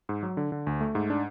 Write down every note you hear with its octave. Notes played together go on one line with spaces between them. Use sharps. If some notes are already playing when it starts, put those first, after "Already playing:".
G#2
F#3
D3
D3
D2
A3
G#2
D4